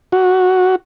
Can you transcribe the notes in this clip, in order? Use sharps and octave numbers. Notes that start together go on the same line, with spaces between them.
F#4